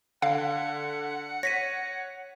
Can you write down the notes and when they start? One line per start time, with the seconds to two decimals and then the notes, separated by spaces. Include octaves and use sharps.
0.22 D3 F5 F#5
1.43 C#5 A#6 B6 D#7